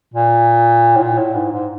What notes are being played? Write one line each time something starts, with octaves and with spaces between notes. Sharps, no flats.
A#2
A2
A#2
A2
G#2
G#2